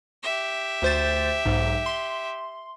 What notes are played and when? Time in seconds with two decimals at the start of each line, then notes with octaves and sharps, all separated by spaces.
0.23 G4 E5
0.82 D2 C5 A6
1.46 B1 G#2
1.86 C6